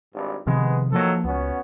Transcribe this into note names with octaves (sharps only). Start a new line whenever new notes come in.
G#1 G2
C3 D#3 F3 G#3 B3
D#3 F3 F#3 A#3 A4
C#2 B3 C#4 F#4